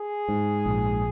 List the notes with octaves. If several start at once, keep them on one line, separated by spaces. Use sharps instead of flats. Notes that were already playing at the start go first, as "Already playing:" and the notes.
Already playing: G#4
G#2
A#1